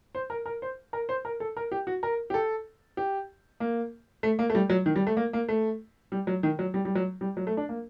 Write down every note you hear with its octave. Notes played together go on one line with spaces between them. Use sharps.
C5
A#4
A#4
C5
A#4
C5
A#4
A4
A#4
G4
F#4
A#4
G4
A4
G4
A#3
A3
A#3
A3
G3
F#3
D#3
G3
A3
A#3
A#3
A3
G3
F#3
D#3
F#3
G3
G3
F#3
G3
F#3
A3
D4
A#3